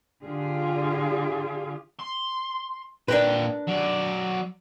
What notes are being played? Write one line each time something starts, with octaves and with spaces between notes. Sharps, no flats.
D3 F4 G4 G#4
C6
A#2 D4 A#4 B4 G5
F#3 D5